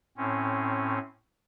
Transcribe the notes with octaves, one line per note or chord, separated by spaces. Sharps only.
A2 C4 C#4